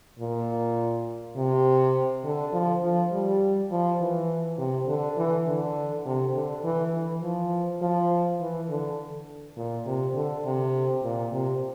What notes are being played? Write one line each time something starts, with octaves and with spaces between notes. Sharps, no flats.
A#2
C3
D3
F3
F3
G3
F3
E3
C3
D3
E3
D3
C3
D3
E3
E3
F3
F3
E3
D3
A#2
C3
D3
C3
A#2
C3